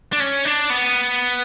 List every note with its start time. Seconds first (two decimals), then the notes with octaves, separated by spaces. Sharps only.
0.13 D4
0.20 C#4
0.45 D4
0.70 B3